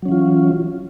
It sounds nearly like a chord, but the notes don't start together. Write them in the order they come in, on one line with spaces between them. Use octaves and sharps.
F#3 C#4 E3 F4